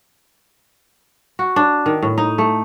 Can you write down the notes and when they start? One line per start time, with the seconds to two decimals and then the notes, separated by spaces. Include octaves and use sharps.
1.39 F#4
1.56 D4
1.86 D#3
2.03 A2
2.18 D#4
2.38 A3